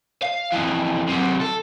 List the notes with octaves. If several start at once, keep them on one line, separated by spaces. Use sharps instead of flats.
F5
F2 E3
C3 F#3
A4